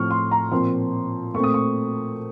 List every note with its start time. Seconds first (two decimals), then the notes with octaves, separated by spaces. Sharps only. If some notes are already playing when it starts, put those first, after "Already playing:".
Already playing: A2 F3 C4 C#6 F6
0.11 C6
0.31 A#5
0.52 A#2 F3 C4 C6
1.34 A#2 A3 C4 C#6
1.44 D#6
1.54 C#6